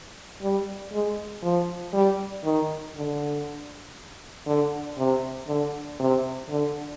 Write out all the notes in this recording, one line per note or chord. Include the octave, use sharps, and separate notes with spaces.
G3
G#3
F3
G3
D#3
D3
D3
C3
D3
C3
D3